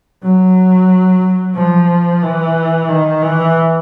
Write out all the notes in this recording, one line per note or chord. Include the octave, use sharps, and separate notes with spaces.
F#3
F3
E3
D#3
E3